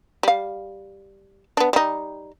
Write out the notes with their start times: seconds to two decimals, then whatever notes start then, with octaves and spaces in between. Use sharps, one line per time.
0.23 G3 F5
1.57 B3 D4
1.73 G3 D#4